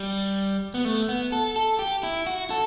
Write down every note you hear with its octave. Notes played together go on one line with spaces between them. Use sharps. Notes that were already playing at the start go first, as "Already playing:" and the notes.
Already playing: G3
B3
A3
B3
A4
A4
G4
E4
F#4
A4